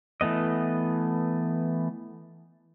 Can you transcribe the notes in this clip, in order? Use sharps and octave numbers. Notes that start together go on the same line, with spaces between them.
E3 A3 B3 D#5